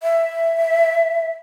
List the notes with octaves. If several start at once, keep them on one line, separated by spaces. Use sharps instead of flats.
E5